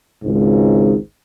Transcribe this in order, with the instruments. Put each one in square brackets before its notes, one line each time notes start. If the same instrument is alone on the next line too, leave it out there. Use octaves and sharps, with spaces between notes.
[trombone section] G#1 C#2 G#2